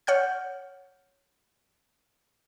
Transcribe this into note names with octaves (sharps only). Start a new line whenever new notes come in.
C#5 F#5 F6 G6